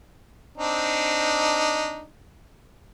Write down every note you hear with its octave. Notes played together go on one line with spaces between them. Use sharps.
C4 D4 D#4